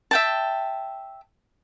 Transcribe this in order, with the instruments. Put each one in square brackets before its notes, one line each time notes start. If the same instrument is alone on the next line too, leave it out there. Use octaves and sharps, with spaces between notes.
[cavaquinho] E5 G5 A5